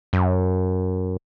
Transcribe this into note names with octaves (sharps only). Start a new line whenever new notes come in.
F#2